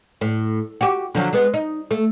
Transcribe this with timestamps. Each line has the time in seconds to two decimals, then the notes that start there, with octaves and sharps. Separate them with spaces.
0.21 A2
0.81 F#4 G4
1.15 D3 F3 F#3
1.33 G#3 B3
1.54 D#4
1.91 A3